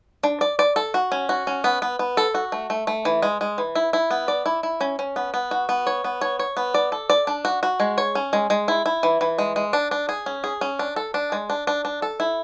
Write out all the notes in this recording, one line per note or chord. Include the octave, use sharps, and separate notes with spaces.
D4
D5
D5
A4
F#4
C#4
F#4
C#4
B3
B3
B3
A4
F#4
A3
A3
A3
E3
G#3
G#3
E3
E4
E4
B3
D5
E4
E4
C#4
C#4
B3
B3
F#4
B3
C#5
B3
C#5
C#5
B3
D5
A4
D5
D4
F#4
F#4
G#3
C#5
C#4
G#3
G#3
E4
E4
E3
E3
G#3
G#3
D4
D4
G#4
C#4
G#4
C#4
D4
A4
D4
G#3
D4
D4
D4
A4
E4